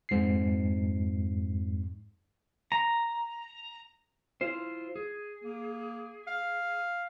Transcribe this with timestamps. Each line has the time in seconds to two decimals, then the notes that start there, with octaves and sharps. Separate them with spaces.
0.09 F2 G#2 C7
2.72 A#5
4.41 E4 F4 C5
4.96 G#4
5.44 A#3
6.27 F5